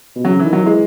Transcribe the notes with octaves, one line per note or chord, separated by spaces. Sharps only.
B2
C#3 F#3
D#3 E3
F#3
E3 G#3